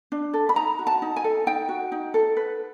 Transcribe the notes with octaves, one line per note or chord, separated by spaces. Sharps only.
D4
A4
B5
D#4 A#5
F#4
A5
D#4
G#5
A4
D#4 G5
F#4
D#4
A4
B4